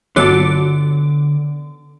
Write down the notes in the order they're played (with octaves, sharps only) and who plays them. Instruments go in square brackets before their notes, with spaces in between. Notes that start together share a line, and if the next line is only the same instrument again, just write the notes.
[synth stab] G1 F#3 D6 [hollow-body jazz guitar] D3 B3 A4